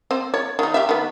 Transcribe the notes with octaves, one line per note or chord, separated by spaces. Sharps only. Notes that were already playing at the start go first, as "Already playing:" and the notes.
C4 C5
C#5
D#3 D#4
G4 E5
D#3 B3